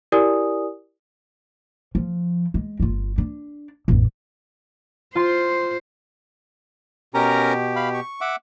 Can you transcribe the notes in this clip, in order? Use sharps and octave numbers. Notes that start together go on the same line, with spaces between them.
E4 G4 A#4 D5 G#5 D#6
F3
G#3
G1 F4
D4
A1 F2
F4 C5 C6
B2 C#4 G4 A#4 A#5
F5 B5
C#6
E5 F#5 D6